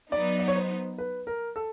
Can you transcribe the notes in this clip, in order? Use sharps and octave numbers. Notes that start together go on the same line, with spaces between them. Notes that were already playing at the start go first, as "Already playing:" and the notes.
F#3 B3 D#4 D5
D5
C#5
C5
B4
A#4
A4